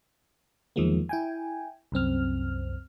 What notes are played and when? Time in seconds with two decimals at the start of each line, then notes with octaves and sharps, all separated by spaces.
0.76 E2 D#3 F3 G#3 A#3
1.09 E4 G5 G#5
1.92 C2 F#2 C4 F6